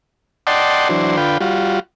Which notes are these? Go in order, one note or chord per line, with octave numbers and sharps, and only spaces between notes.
D5 D#5 F#5 G5 A5 C6
E3 F#3 D4 C5
D3 F4 B4 G5
G3 F4 F#4